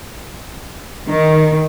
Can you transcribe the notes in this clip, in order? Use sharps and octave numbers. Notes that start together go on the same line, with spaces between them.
D#3